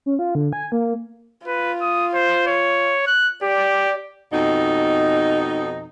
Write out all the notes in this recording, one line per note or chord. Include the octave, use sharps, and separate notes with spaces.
C#4
F4
D3
G#5
A#3
F4 B4
D#6
C5
C#5
F#6
G4 D5
F2 B2 D#4